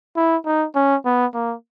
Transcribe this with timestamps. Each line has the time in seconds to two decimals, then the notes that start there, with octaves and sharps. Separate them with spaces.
0.16 E4
0.45 D#4
0.75 C#4
1.05 B3
1.34 A#3